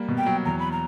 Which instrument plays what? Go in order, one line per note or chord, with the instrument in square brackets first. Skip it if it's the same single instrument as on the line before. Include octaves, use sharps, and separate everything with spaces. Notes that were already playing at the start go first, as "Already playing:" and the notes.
Already playing: [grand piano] G3 A#3
B2
[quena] G5
[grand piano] F#3
[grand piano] E2 [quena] A#5
[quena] B5
A#5